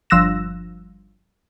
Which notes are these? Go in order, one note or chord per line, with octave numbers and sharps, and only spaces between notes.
G1 F3 E6 F#6 A#6 E7